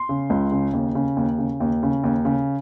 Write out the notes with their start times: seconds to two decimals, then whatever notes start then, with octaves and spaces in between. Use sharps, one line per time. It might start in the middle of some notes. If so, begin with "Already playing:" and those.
Already playing: C6
0.09 C#3
0.30 C#2
0.52 C#3
0.74 D#2
0.95 C#3
1.17 D#2
1.38 C#3
1.60 D#2
1.83 C#3
2.04 D#2
2.25 C#3